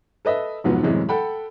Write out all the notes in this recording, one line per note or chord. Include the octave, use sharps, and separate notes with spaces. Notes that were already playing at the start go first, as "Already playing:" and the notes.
A4 B4 D#5 E5
F1 G#2 F3 F#3 B3
F#2 A2 C3 E3 G#3 E4
A4 F#5 G5 B5